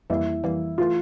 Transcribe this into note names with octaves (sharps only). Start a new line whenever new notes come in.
F2 E3 G3 A#3 E4
F2 E3 G3 A#3
E3 A3 F4